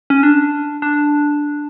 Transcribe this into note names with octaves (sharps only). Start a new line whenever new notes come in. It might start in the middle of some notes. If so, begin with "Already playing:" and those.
C#4
D4
D4